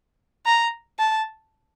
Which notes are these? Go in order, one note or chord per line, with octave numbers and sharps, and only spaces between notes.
A#5
A5